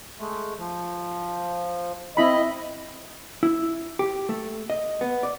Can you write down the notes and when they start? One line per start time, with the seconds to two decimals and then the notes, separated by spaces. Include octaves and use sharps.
0.19 G#3 A3
0.58 F3
2.17 C4 E4 D#5 B5
3.43 E4
3.99 G4
4.29 A3
4.70 D#5
5.01 B3
5.23 D5